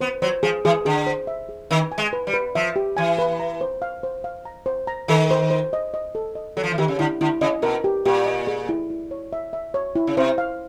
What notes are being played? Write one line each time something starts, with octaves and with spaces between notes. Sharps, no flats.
B3 C5
F#3 C5
F3 G#4
E3 G#4
D3 G#4
C5
E5
G#4
D#3 B4
G#5
G#3
B4
G3
B4
F3 E5
G4
E3 G#5
B4
A#5
C5
F5
C5
F5
A#5
C5
A#5
D#3 A4
C5
C5
D#5
D#5
A4
D#5
F#3 A4
F3
E3
D#3 G4
C#3
D3 E4
D3 E4
C#3 D#5
B2 A#4
G4
A#2 G4
D#5
G#4
E4
E4
C#5
E5
E5
C#5
E4
C#3
C3 C5
F5